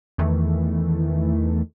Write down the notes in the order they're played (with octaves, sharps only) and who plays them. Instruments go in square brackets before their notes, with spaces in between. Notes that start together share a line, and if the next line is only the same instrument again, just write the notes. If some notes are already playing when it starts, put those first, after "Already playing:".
[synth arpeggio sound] E2 D#3 E3 A3